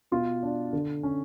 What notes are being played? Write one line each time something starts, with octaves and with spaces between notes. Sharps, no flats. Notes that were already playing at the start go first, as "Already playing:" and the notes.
B2 F4
D4
D3
C#4